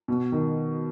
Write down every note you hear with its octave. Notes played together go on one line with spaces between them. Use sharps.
B2
D#3